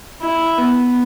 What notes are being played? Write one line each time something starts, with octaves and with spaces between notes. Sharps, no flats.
E4
B3